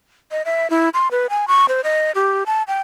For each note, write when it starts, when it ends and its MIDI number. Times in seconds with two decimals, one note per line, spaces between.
0.31 0.42 75
0.45 0.70 76
0.70 0.89 64
0.94 1.08 84
1.11 1.27 71
1.30 1.46 80
1.48 1.66 85
1.69 1.81 72
1.84 2.11 75
2.15 2.44 67
2.46 2.63 81
2.68 2.81 79